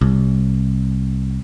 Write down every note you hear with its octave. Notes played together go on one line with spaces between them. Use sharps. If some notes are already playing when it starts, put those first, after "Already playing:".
C2